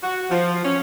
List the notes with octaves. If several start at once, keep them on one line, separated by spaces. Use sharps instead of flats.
F#4
F3
C#4